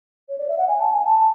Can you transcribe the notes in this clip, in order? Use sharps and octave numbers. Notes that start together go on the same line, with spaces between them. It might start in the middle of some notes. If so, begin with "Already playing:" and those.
C#5
D5
E5
F#5
G#5
A5
G#5
A5